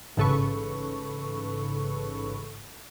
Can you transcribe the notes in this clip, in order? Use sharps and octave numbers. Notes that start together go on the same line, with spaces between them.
A1 G#2 C#3 A4 B4 C#6